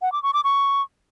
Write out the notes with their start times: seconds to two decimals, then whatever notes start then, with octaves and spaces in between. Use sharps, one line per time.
0.02 F#5
0.12 D6
0.23 C#6
0.33 D6
0.44 C#6